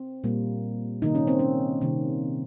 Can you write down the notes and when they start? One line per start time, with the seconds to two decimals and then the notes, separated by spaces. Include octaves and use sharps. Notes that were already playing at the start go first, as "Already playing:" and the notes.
Already playing: C4
0.24 A#2 G3 A#3
1.02 C3 D#3 A#3 D#4
1.15 C#4
1.27 C4
1.39 C#4
1.81 C3 D#3 A#3